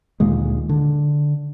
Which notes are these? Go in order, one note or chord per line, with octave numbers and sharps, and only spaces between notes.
D2 A#2 D#3 G#3
D3